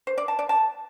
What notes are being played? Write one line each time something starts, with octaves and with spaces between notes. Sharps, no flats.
C5
D5
A5
D5
A5